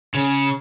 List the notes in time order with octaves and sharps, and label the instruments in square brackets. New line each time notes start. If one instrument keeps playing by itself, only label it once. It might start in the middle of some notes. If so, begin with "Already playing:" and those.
[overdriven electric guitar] C#3